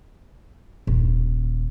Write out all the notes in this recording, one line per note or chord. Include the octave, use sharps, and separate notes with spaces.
D#1